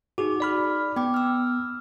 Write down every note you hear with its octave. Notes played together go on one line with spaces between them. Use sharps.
D#4 F#4 G#4 D6
D5 B5 F6
B3 G5 D6
E6 F6